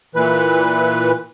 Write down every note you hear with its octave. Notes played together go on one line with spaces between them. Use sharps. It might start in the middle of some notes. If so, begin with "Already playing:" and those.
A#2 E3 B4